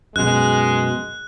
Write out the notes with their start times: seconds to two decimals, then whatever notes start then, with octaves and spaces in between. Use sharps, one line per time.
0.16 F#2 B2 G#3 F#6